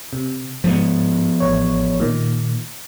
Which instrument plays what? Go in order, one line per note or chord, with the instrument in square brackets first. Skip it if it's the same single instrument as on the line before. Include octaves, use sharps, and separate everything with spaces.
[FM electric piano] C3
[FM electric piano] G#2 [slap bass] F3 B3
[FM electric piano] A1 C#5
A#2 D#3